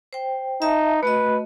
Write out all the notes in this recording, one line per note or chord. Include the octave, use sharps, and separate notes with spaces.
C5 G5
D#4 E5 A5
A3 F#4 B4 D#5